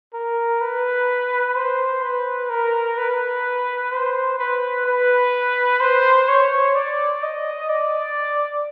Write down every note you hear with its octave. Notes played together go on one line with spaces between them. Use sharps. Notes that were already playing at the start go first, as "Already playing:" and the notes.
A#4
B4
C5
B4
A#4
B4
C5
B4
B4
C5
C#5
D5
D#5
D5